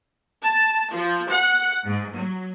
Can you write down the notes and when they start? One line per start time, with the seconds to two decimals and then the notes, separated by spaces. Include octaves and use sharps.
0.44 A5
0.92 F3
1.28 F#5
1.84 G#2
2.14 F#3